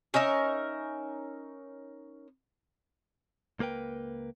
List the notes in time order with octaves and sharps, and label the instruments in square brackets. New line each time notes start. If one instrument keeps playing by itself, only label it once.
[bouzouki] C#4 D#4 A#4 E5
[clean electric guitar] C#2 A#3 A#4 B4 G5